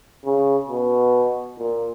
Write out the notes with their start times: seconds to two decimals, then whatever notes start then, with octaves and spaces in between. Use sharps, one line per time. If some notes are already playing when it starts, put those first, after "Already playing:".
0.25 C#3
0.69 B2
1.58 A#2